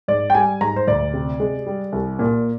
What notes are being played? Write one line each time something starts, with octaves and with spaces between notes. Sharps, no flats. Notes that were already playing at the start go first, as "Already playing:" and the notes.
G#2 D5
G5
G3 G#5
G#2 A#5
C5
D2 D5
C3
G#3
G3
C2
A#2